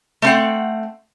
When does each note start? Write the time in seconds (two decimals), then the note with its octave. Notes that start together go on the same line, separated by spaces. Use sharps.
0.22 A3 C4 F#5